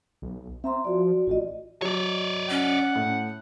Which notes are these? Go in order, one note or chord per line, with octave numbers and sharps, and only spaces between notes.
B1
C4 E5 A#5 C6
F3 F#4 D5
A1 F4 F#4 D#5
F#3 C#5 D5
C#4 F#5
A2